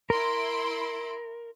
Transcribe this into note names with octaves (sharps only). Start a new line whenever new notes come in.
E4 A#4 C6 D7